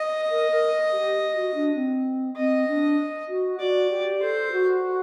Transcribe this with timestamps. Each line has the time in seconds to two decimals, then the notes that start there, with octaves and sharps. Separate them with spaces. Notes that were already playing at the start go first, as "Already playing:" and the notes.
Already playing: D#5
0.31 A#4
0.51 A#4
0.93 G4
1.34 F#4
1.54 D4
1.75 C4
2.36 C4 D#5
2.68 D4
3.29 F#4
3.60 F#4 D5
3.90 G4
4.22 A4 C5
4.52 F#4